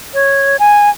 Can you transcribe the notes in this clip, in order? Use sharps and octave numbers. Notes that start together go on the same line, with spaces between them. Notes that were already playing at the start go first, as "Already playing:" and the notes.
C#5
G#5